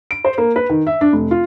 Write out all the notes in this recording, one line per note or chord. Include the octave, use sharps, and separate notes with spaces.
D7
C5
A#3
B4
D#3
E5
D4
F1
F4